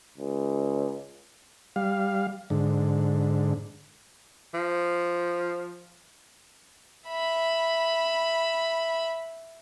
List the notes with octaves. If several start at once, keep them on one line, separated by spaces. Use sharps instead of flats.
C#2
G3 F5
G#2 D3
F3
E5 B5